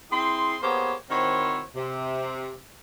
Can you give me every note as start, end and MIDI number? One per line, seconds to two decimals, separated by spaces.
0.11 0.57 60
0.11 0.57 64
0.11 0.57 68
0.11 0.57 84
0.62 0.93 58
0.62 0.93 59
0.62 0.93 67
0.62 0.93 68
0.62 0.93 72
0.62 0.93 73
1.10 1.61 51
1.10 1.61 60
1.10 1.61 64
1.10 1.61 66
1.10 1.61 72
1.10 1.61 73
1.75 2.54 48